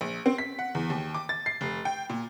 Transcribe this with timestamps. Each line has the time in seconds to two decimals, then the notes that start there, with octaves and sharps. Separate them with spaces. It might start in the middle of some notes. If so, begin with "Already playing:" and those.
0.01 A#1
0.26 C4
0.38 B6
0.59 F#5
0.75 E2
0.90 D#2
1.15 D6
1.29 A6
1.46 C7
1.61 F1
1.85 G5
2.10 A#2